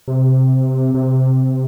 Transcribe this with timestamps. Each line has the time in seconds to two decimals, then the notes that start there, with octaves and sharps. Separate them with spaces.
0.08 C3
0.94 C3